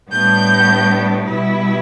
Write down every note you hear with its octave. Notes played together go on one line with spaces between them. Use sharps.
A2 G3 B3 D4 G6
B2 G3 B3 E4